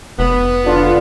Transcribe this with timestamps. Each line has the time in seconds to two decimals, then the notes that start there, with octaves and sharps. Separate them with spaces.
0.19 F1 B3
0.66 D3 D4 F4